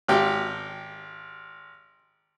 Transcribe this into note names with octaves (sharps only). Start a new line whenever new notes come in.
G#1 G4